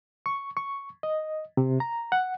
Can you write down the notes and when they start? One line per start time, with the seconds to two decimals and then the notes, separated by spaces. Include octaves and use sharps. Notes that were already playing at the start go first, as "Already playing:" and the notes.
0.26 C#6
0.57 C#6
1.03 D#5
1.57 C3
1.80 A#5
2.12 F#5